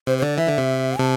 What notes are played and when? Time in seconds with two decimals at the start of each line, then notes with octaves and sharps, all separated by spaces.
0.07 C3 C5
0.18 C5
0.22 D3 D5
0.38 E3 E5
0.48 D3
0.58 C3
0.99 C3 A5